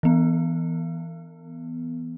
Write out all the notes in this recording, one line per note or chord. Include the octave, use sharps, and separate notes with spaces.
E3 B3